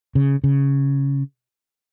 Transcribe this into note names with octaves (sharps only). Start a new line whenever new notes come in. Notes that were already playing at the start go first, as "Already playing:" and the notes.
C#3
C#3